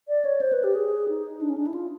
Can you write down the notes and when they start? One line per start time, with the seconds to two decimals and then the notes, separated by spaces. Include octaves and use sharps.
0.08 D5
0.25 C#5
0.41 C5
0.53 B4
0.64 G4
0.75 G#4
1.09 D#4
1.41 D4
1.50 C#4
1.58 D4
1.67 E4
1.74 F4